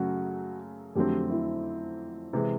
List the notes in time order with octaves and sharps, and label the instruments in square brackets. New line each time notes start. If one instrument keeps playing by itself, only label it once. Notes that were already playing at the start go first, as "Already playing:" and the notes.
Already playing: [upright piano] F#2 C#3 F#3 A3 C#4 [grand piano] F#4
[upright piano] F2 D3 F#3 A3 C4 [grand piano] G4
[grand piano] E4
[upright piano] C3 E3 G#3